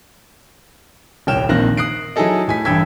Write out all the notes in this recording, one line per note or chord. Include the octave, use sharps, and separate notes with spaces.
D#1 C2 C#5 G5 F6 E7
A#1 D#3 A#3 C4 F#6 A#6
D#6 F#6 C7 D7
F#3 D#4 E4 G#4 A4 D#5
A2 G#5 B6
A1 G2 G5 E6 G#6 B6